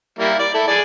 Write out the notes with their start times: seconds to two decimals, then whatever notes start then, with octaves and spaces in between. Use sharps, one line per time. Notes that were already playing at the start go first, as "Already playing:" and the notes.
0.19 G3 A#3 E4
0.39 D5
0.54 E4 A4
0.68 G#4 D5